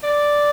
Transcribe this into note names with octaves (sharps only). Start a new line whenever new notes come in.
D5